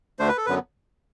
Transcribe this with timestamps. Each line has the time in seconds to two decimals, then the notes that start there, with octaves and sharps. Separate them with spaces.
0.19 D2 D3 A3 D4 C5
0.28 B4
0.37 A4
0.46 F#2 D3 F#3 B3 B4